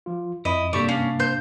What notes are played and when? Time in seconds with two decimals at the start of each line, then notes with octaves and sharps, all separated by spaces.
0.06 F3 F4
0.45 F2 E4 D#5 B5
0.73 G2 C3 A#3 G4 A4 D5 C#6
0.89 C#4 D4 F5
1.20 C5 G6